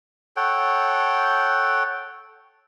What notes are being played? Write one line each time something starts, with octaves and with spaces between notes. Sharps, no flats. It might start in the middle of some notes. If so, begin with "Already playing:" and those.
A4 C#5 F#5 G5